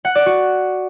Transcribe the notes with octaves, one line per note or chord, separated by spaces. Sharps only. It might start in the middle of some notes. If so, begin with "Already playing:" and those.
F#5
D5
F#4